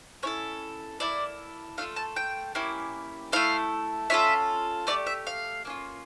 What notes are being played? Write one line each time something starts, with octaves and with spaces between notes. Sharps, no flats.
C#4 E4 A4 C#5
A#3 E4 A4 D5
A3 D4 F4 A4 F5
A5
G5
A#3 C#4 E4 G4
A3 E4 A4 F5
C#4 F4 A4 E5
A3 E4 G4 D5
E5
F5
A#3 C#4 F4